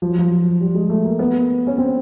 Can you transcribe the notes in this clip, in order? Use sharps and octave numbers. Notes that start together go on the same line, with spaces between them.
F3
F#3
F3
G3
G#3
A3
A#3
B3
C#4
C4